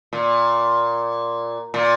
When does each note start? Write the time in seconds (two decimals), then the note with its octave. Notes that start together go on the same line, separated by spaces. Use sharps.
0.13 A#2
1.74 A#2